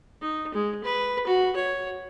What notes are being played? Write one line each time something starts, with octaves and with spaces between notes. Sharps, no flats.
D#4
G#3
B4
F#4
C#5